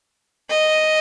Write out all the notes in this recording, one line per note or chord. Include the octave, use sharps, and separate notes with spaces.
D#5